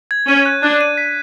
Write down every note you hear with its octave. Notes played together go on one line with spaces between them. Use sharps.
G#6
C#4 D#7
F#6
D4 F#6
D#7
B6